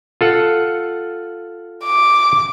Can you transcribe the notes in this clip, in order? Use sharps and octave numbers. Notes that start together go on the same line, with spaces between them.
F4 A4 F#5
D6